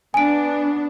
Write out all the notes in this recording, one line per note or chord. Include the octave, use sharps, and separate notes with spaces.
B3 D4 G#5 D7